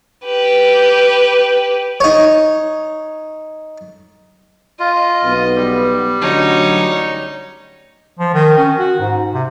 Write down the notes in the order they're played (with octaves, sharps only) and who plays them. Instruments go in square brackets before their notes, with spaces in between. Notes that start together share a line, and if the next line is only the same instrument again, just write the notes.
[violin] G4 B4
[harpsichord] D#4 C#5
[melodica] F4 [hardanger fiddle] D#5
[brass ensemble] B1 B3
[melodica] G3
[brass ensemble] A1 D3 F#3 [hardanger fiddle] D#4 C#5
[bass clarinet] F3
D#3
C#4
F#4
G#2
C3